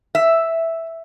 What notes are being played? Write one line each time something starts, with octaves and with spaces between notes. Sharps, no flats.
E5